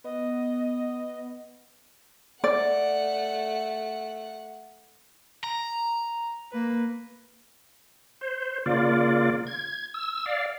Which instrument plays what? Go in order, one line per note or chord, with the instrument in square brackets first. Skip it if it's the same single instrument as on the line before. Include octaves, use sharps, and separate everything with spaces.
[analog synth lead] B3 [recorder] D#5
[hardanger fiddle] A3 F#5 [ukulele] D5
[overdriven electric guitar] A#5
[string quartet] A#3 B4
[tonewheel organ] C5
C#3 A#3 F4 D5
G#6
E6
D5 F5